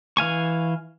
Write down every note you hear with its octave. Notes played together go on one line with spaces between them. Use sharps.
E3 F5 G#5 C#6